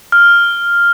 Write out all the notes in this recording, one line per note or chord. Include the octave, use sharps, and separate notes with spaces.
F6